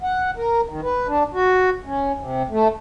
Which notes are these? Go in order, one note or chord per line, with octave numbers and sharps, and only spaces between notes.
F#5
A#4
D#3
B4
D4
F#4
C#4
C3
A3